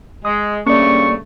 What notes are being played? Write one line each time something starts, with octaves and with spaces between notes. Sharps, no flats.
G#3 D#6
G2 C#3 A3 A#3 C#4 D5 C#6